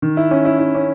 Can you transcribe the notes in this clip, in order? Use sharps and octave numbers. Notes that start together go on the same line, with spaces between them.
D#3
E4
C#4
E4
E4
C#4